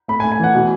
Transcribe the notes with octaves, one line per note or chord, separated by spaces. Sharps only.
A3 B5
G#5
A3
G#5
E3 F#5
B2